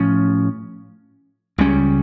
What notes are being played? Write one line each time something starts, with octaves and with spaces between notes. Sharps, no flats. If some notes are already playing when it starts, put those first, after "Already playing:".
Already playing: A2 F3 C#4
C#2 C#3 G3 C#4